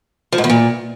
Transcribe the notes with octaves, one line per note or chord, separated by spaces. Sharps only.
F3
G#2
E2
A#2